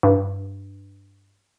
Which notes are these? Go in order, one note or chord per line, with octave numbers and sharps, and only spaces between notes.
G2